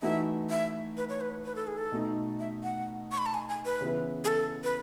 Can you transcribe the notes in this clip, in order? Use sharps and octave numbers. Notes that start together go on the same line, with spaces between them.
E3 A3 D#4 F#4 E5
E5
B4
C#5
B4
B4
A4
G#4
A4
B2 A3 D#4
E5
F#5
C#6
B5
A5
G#5
G#5
B4
C#3 E3 B3 E4
G#4
A4
B4